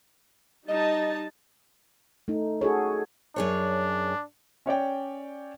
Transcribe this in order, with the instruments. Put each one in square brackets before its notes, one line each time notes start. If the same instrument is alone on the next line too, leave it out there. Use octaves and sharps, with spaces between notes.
[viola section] G3 D#4 A5 [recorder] D#5
[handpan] A3 D#4
F#4 G#4 A4 C#5
[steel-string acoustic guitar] F#2 G#4 C#5 [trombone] D4
[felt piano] C#4 C#5 D5 G5